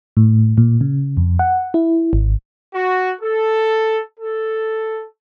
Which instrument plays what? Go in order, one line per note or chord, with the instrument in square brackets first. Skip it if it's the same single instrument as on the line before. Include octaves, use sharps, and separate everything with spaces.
[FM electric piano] A2
A#2
C#3
F2
F#5
E4
G#1
[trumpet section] F#4
A4
A4